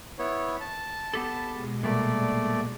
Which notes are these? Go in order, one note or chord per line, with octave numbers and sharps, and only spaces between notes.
B3 E4 C#5
A5
B3 G4 A4
B2 G#3
A#2 G3 A3 A#3 D5